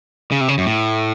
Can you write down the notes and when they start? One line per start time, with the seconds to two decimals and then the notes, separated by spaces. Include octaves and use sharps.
0.32 C#3
0.41 C3
0.48 C#3
0.58 F#2
0.66 A2